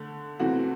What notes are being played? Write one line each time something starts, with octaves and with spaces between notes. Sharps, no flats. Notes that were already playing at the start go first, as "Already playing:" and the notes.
Already playing: D3 A3
C3 E3 A3 F#4